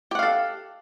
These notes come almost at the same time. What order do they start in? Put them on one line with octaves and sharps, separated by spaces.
G4 F#5 F5 A4